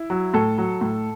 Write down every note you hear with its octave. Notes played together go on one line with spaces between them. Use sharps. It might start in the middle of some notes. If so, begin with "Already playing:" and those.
Already playing: E4
F#3
A2 A4
F#3
A2